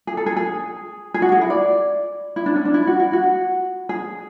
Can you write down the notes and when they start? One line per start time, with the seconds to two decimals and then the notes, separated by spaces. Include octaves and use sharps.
0.07 G#4
0.17 A4
0.26 G#4
0.37 G#4
1.14 G#4
1.22 F#4
1.32 G#4
1.41 E4
1.50 D5
2.36 E4
2.46 D4
2.56 C#4
2.65 D4
2.74 E4
2.87 F#4
3.00 E4
3.13 F#4
3.89 G#4